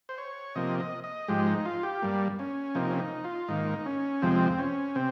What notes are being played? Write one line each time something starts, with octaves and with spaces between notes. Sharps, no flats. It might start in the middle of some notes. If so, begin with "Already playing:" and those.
C5
C#5
C3 F3 A#3 D#5
D#5
D#5
G#2 F3 G#3 G4
D#4
F4
G4
G2 G3 A#3
C#4
C3 F3 A#3 D#4
C#4
D#4
F4
G#2 D#3 A#3 D#4
C#4
F2 C3 F3 G#3 C4
C#4
C3 C4